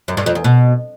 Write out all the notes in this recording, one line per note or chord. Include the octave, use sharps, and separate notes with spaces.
F#2
G2
F2
E2
B2